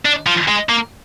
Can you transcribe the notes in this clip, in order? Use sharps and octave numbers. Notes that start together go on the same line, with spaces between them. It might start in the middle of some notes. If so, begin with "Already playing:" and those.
D4
F3
G#3
A#3